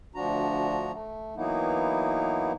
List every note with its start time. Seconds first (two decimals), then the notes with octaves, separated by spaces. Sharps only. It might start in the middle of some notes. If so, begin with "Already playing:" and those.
0.15 D2 F3 D4 F#4 A#5
0.93 A3
1.36 E3 F#3 A#3 B3 D#4 E4